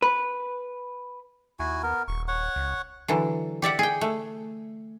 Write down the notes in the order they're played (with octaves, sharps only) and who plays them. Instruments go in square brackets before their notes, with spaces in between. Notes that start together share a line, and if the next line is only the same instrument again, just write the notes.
[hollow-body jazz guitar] B4
[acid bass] D#2 [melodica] E4 F#4 G#5
[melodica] B3 A#4
[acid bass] D#1 [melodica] C#6
[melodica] C#5 F#5 C#6
[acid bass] C#2
[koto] D3 E3 F#3
G4 D5 E5 F#5
G#4 G5
A3